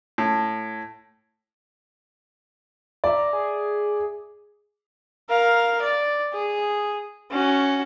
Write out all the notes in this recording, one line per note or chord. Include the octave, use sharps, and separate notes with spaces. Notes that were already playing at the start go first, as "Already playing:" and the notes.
A2
D5 E5 A#5
G#4
A#4 F5
D5
G#4
C#4 F#4